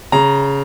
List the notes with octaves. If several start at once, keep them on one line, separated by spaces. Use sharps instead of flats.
C#3 A#5